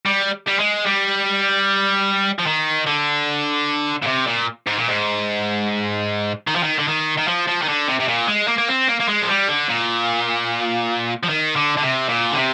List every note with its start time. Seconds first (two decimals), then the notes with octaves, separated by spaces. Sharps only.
0.06 G3
0.47 G3
0.59 G#3
0.86 G3
2.39 F3
2.46 D#3
2.86 D3
4.02 A#2
4.07 C3
4.27 A#2
4.67 G#2
4.77 A#2
4.88 G#2
6.47 D#3
6.56 F3
6.63 D#3
6.79 D3
6.88 D#3
7.18 D#3
7.28 F3
7.48 F3
7.62 D#3
7.68 D3
7.88 C3
8.00 C3
8.08 A#2
8.28 G#3
8.48 A#3
8.58 A#3
8.68 C4
8.88 A#3
9.00 A#3
9.08 G#3
9.22 F3
9.29 G3
9.48 D3
9.69 A#2
11.23 F3
11.29 D#3
11.56 D3
11.77 D3
11.82 C3
12.09 A#2
12.31 D3
12.36 C3